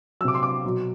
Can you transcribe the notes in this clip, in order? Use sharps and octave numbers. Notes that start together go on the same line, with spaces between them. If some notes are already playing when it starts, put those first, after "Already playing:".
C3 F#3 D6 E6
C6
D6
B2 F#3